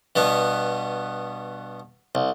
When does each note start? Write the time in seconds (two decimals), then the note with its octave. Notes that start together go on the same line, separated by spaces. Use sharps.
0.16 G2 B2 B3
2.15 C2